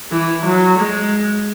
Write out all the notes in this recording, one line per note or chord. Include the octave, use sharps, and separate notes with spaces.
E3
F#3
G#3